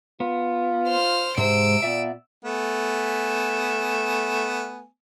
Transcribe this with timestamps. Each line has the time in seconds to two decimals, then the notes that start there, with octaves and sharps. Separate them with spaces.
0.20 B3 F4
0.88 C5 F6
1.38 G#2 C3 G#3 C5 E6 D7
1.82 A#2 B3 D5 E5
2.45 A3 B3 G#5